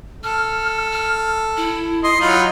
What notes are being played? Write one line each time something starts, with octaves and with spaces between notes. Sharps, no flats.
A4 F6
F6
E4
D#5 C6
F#3 D#4 F4 B5